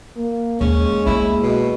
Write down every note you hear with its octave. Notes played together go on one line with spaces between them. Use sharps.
A#3
D#2 G#3 C#4
A#3 B3 E4
B2